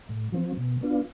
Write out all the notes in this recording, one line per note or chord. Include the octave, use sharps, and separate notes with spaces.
A2
F3 C4
B2
B3 D4 F4